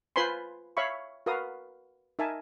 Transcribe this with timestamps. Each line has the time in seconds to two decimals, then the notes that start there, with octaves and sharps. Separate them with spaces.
0.16 F4 B4 C5 G#5 B5 C6
0.77 C#5 E5 F5 B5 C#6
1.26 F#4 A#4 B4 F5 D#6
2.19 D#4 A#4 E5 G#5 A5